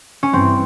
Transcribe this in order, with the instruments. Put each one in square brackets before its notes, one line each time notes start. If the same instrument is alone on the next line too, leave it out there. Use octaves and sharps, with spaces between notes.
[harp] C#4
[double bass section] G2 E3 [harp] C4